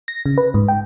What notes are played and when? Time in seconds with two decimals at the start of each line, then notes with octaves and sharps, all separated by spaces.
0.08 A#6
0.26 C#3
0.38 B4
0.54 G#2
0.68 G5